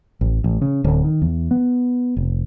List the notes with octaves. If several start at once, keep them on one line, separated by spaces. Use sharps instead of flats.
A1
A1
C#3
D1
D#3
E2
B3
F1